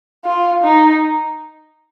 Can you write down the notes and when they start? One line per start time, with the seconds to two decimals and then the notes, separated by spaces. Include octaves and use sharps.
0.25 F4
0.63 D#4